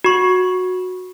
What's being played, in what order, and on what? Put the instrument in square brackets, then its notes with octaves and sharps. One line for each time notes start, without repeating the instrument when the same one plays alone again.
[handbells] F#4 C#6